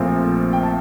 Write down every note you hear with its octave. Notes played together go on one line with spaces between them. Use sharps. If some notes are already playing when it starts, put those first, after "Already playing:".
Already playing: A#1 A#2 F3 A3 C4
G5
A5